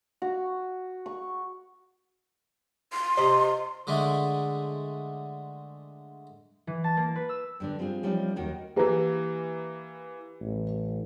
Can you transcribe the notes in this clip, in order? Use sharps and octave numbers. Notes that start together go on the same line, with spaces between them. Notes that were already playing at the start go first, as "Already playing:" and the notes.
F#4
C#6
C6
C3 C5 D#5
D3 G#3 A3
E3
A5
A#3
B4
E6
G2 D3 D4
G3 C4 F4 G#4
F3 G3 A3 C4 C#4 D#4
D#2 D#3 F#4 A#4
E3 A#3 G4 B4 A#5
A1